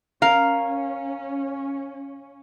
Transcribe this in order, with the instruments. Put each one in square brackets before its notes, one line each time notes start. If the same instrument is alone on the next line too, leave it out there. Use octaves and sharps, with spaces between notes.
[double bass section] C#4 [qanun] A#4 [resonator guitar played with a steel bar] F5